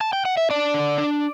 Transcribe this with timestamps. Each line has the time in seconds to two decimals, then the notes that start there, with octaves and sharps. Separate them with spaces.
0.01 A5
0.13 G5
0.25 F#5
0.37 E5
0.50 D4 D5
0.74 D3
0.98 D4